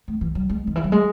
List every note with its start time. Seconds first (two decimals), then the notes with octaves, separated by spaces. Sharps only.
0.08 A3
0.21 E3
0.35 F#3
0.50 G#3
0.67 D#3
0.76 E3
0.84 F#3
0.92 G#3